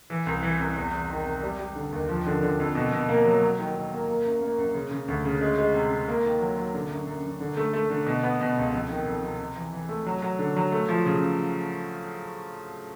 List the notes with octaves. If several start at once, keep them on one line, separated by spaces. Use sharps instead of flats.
E3
C2
E3
C2
E2
E2
D#3
C3
G3
G3
D3
D#2
F3
D3
D3
F2
B2
B2
A#3
F#3
F#3
D#3
D#3
A#3
A#3
F#2
A#3
F#2
C#3
C#3
D2
C#3
G#3
G#3
C3
C3
A#3
D#3
F#3
F#3
D3
F#2
F#2
F#2
D3
A3
A3
D3
B2
B3
B2
C#2
F2
D#3
F2
C3
C3
E3
E3
A3
F#3
F#3
D3
F#3
A3
F3
C#3